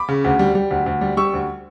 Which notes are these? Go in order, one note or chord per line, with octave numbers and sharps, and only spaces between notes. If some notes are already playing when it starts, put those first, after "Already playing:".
Already playing: B5 D6
C#3
D2
G3
G3
D2
D2
G3
G3 C#6 E6
D2